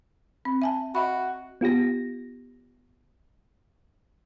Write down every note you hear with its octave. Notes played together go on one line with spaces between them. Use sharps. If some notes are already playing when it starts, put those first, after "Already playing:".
C4
E5 G#5 A5
F#4 D#5 E5 B5
B3 F4 G4 A#6